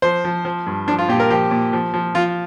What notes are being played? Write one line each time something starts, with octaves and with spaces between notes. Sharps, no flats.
F3 C5
F3
F3
G2
F3 D4
F4
A#2 G4
A#4
F3 G4
A#2
F3
F3
F3 F4